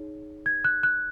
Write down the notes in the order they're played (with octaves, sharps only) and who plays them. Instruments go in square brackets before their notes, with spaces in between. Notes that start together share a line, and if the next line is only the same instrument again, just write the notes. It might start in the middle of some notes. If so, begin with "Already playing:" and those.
Already playing: [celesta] D#4 G#4 C#5
G#6
F#6
F#6